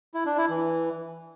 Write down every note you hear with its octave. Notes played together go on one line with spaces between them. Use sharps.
E4
D4
E4
E3